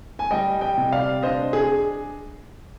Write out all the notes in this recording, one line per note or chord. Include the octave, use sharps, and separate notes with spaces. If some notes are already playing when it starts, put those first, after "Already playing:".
G#5
G3 D#5 G5
D#5 G5
C3
D5 F5
D4 C5 D#5
G#4